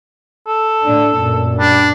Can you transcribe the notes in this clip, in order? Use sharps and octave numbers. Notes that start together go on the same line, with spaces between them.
A4
A2 D4
F#2 A#2
G3 D4